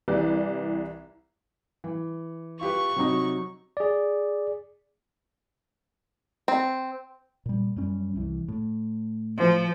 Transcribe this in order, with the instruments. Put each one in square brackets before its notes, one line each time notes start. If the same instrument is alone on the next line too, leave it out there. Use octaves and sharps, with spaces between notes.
[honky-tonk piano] C2 E3 G4 B4 D5
[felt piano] E3
[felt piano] F4 G4 B4 [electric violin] C#6
[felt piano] C3 F#3 D#4
[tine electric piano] G#4 D5
[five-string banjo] C4
[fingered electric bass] A#2 G3
F#2 G3 C#4
C2 E3
A2
[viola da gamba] F3